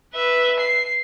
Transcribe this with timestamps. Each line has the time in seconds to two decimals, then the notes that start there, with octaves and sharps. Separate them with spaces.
0.14 B4 E5
0.60 C7